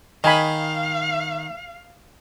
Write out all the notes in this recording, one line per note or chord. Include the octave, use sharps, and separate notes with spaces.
D#3 D#5 F5 G#5 B5